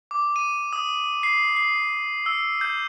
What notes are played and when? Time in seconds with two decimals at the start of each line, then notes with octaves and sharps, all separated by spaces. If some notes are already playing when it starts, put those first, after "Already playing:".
0.11 D6
0.36 D#7
0.73 D#6
1.23 C7
1.56 C7
2.26 E6
2.61 G6